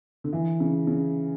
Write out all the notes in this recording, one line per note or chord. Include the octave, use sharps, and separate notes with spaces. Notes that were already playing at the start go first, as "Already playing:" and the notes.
D3
E3
C#3
C#3